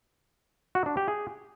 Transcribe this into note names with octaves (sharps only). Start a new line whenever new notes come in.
F#4
D4
G4
G#4